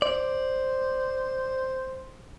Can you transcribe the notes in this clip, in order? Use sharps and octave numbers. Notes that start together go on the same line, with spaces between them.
C5 D5